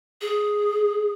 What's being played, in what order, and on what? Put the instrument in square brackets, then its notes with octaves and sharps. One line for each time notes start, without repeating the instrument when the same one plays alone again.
[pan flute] G#4